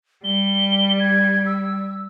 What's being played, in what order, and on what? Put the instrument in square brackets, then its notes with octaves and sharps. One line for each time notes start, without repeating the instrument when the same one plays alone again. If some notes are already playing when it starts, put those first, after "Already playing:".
[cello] G3 [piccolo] G7
[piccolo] G#6
E6